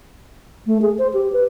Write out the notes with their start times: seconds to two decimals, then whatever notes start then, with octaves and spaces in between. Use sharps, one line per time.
0.67 A3
0.82 G#4
0.98 C5
1.14 G4
1.33 B4